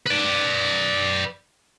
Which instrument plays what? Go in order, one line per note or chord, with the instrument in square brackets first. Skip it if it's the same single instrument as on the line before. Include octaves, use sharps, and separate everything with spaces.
[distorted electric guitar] B4 D5